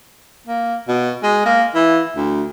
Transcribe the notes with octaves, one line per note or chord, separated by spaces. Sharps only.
A#3
B2
G#3
A#3
E3
D2